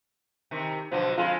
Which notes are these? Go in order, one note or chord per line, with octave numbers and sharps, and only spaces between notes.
C3 D#3
B2 D3 F3 F#3
F2 G#3 F4 A4